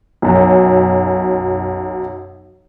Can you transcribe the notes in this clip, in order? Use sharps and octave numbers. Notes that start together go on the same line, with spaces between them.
B1 F#2